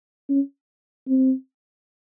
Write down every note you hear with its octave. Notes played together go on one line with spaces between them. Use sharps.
C#4
C4